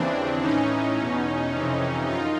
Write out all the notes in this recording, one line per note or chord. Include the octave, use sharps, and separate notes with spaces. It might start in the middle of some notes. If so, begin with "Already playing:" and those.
Already playing: D#2 C#3 E3 C4 D4
A2 E3 C#4 D#4
E2 B2
F2 C3 E3
F#2 D#4 F4